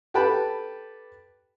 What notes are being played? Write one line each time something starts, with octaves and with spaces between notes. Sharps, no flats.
G4 A4 B4 G5 A5 B5